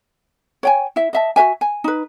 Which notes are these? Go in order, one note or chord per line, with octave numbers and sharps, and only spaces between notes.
C#5 G5 G#5
E4 E5
D#5 E5 A5
F#4 B4 E5 G#5
G#5
D#4 B4